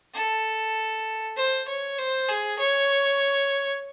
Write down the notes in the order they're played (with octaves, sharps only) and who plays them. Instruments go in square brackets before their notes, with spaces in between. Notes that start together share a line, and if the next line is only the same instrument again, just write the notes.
[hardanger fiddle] A4
C5
C#5
C5
G#4
C#5